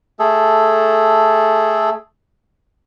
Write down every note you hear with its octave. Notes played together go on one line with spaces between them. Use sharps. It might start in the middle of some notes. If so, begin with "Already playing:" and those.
A3 G#4 A4